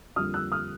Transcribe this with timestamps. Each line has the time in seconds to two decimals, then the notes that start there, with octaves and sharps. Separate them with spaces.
0.16 F2 D3 G3 A#3 D#6 F6
0.34 E6 F#6
0.52 D#6 F6